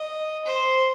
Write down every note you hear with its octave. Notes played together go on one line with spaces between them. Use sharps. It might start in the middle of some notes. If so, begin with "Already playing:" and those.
Already playing: D#5
C5